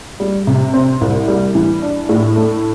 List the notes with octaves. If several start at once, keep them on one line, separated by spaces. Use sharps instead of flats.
G3
C3
C4
C2
G3
E3
D4
A2
A3